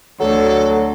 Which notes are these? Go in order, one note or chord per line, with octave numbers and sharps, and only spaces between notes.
D2 F#3 A4